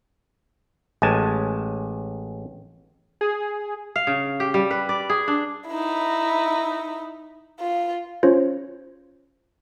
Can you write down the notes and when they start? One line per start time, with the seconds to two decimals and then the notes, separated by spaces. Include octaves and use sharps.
1.02 A1 G#3 G#5 A5
3.21 G#4
3.96 F5
4.07 C#3
4.40 G4
4.54 G3
4.71 B4
4.89 D5
5.10 G#4
5.28 D4
5.68 D#4 E4
7.60 F4
8.23 C#4 F4 C5 C#5